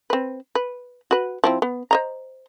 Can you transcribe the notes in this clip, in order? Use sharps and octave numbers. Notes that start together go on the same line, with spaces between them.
C4 B4
B4
F#4 B4
F3 C4 E4
B3
C5 D#5 A#5